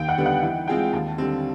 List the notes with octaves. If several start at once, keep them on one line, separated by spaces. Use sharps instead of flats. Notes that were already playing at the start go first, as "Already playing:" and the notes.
Already playing: D#2 G5
F#5
D3 G3 B3 D4
F#5
E3 F#5
G#3 C4 F4 G#4 G5
D#2 A5
D3 G3 C4